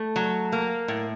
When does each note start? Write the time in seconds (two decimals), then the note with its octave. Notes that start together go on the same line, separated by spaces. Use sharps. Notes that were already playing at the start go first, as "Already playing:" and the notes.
Already playing: A3
0.16 F#3
0.52 A#3
0.88 A2